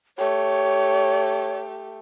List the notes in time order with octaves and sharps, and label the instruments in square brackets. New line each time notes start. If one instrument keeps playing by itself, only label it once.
[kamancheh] A3 G4 [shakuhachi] C#5